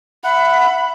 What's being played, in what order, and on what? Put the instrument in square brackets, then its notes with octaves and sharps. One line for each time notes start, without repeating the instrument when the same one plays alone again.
[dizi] E5 [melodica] F#5 [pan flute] B5